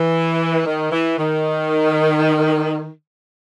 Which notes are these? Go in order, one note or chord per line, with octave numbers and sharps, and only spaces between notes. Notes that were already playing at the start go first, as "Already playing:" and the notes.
Already playing: E3
D#3
E3
D#3